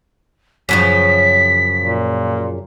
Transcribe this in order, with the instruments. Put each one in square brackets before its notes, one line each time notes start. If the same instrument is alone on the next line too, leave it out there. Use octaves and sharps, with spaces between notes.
[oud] F#2 C#3 F3 [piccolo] B6
[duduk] A#2